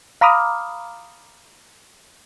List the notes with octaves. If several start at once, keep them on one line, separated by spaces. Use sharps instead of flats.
F5 A#5 B5 D6 D#6 F6